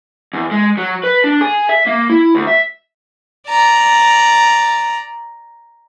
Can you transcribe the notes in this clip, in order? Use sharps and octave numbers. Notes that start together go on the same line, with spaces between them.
E2
G#3
F#3
B4
D4
G#4
E5
A#3
E4
D2
E5
D5 A#5